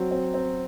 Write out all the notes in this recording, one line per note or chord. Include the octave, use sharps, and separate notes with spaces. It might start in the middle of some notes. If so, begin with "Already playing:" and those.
Already playing: F#3 C4
C4
C4